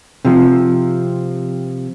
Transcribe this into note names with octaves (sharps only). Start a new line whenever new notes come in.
C3 F3